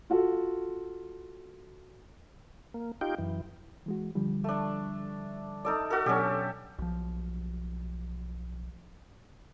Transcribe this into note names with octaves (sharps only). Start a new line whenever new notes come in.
F4 F#4 A4
A#3
D#4 F4 G4 G5
F#2 E3
E3 G#3 F#4
D3 F3 G3
A3 D4
D#4 A4 D5
F#4 A4
B2 F#3 C#4 D4 G4
B1 F3